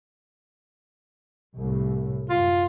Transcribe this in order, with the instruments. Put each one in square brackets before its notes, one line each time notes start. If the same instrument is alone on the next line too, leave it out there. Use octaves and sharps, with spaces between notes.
[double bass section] C2 A2
[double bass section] F#2 [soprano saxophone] F4